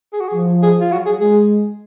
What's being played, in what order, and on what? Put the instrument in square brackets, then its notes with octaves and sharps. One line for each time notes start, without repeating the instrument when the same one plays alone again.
[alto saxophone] G#4
F#4
G#4
[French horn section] F3
[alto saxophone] G#4
F4
[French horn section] F#3 [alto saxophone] F#4
[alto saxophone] G#4
[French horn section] G#3 [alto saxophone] G#4